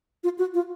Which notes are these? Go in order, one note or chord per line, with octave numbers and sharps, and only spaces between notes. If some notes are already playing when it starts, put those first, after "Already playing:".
F4
F#4
F4